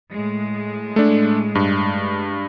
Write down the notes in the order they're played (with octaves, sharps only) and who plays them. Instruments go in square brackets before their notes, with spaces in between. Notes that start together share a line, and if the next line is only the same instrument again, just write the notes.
[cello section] A2 G#3
[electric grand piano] A3 D4
G2